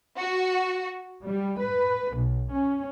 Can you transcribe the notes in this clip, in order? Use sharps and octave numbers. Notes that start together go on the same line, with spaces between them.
F#4
G3
B4
B1
C#4